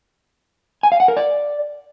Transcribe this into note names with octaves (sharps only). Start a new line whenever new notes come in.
G#5
F5
F#5
A#4
D5